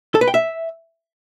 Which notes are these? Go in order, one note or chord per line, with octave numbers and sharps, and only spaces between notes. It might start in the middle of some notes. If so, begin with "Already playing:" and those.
A4
B4
G5
E5